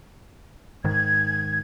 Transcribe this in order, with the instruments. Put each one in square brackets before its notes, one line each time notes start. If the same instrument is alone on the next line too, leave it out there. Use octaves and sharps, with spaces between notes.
[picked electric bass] G#2 D#3 [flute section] G#6